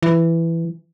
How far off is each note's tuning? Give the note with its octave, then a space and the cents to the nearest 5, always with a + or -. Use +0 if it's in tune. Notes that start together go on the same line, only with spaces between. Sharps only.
E3 +10